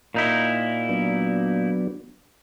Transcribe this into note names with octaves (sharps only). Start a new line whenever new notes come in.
A#2 D#4 E4
F#3 B3 D4